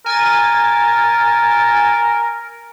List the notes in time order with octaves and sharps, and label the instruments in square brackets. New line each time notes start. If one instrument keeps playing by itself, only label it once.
[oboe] A#4 [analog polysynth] G#5 A6